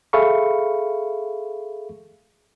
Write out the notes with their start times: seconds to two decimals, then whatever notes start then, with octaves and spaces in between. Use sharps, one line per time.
0.13 G#4 A4 E5 F5 B5 C#6